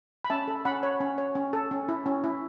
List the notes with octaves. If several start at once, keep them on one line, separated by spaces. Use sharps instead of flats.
B5
C#4 E5 A5
A4
C#4 F#5 B5
C#5
C#4
C#5
C#4
A4
C#4
E4
C#4
E4